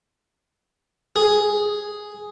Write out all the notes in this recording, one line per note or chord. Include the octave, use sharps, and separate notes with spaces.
G#4